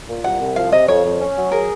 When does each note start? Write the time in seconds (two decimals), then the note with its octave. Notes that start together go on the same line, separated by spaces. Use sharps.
0.08 A#2
0.24 C2 F#5
0.40 C2
0.56 F3 F5
0.72 C3 D#5
0.88 F2 C#5
1.04 F2
1.20 C#4
1.36 F#3
1.51 G#4 A#4